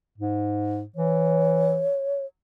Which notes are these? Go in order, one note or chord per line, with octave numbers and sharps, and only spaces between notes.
G#2
E3 C#5